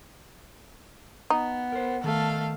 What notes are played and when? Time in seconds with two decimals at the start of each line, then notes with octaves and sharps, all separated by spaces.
1.30 B3 D#4
1.72 A#4 C5
2.04 D#3 A3 F5 A5